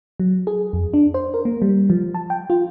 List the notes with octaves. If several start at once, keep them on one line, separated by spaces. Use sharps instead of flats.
F#3
G#4
F2
D4
C5
A#4
A#3
G3
F3
A5
G5
F4